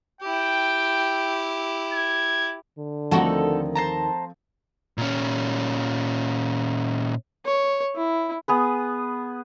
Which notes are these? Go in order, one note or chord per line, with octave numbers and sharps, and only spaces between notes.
E4 G4 G5
G#6
D3
D#2 D#3 F3 A3 C4 D#4 F#4 A4
C5 A5 A#5
A#2 C#4
C#5
E4
B3 G#4 B4